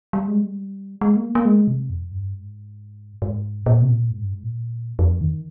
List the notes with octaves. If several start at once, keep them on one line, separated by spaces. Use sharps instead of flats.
G3
G#3
G3
G#3
A#3
A#3
G#3
C3
F2
G2
G#2
G#2
A#2
C3
A#2
G#2
G2
G#2
A#2
F2
D#3